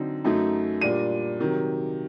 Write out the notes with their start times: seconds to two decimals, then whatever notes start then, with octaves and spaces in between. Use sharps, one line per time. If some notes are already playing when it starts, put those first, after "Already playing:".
Already playing: D3 F#3 C4 D#4
0.24 F#2 F#3 A3 D#4
0.81 A#2 G3 D4 D#7
1.39 C3 D#3 F#3